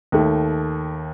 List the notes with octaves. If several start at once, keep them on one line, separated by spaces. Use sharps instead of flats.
D#2 D#3 A3